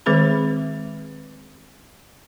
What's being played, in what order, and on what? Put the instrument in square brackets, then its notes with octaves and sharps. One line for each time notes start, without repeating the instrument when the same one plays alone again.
[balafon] D#3 G#3 C4 G#4 B4 B5